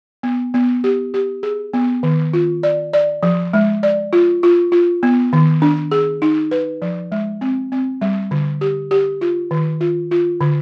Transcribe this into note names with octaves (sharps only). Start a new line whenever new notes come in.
B3
B3
G4
G4
G#4
B3
D#3
F4
D5
D5
F3
G#3
D5
F4
F4
F4
B3
D#3
D4
G#4
D#4
B4
F3
G#3
C4
C4
G3
D3
G4
G4
F4
D#3
F4
F4
D3